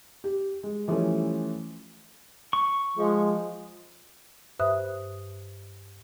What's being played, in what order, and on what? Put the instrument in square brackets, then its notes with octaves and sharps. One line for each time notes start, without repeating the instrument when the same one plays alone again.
[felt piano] G4
G#3
E3 F3 G3 A3 C#4
[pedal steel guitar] C#6
[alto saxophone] F3 [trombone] G#3
[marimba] G2 B4 C5 E5 D#6 F#6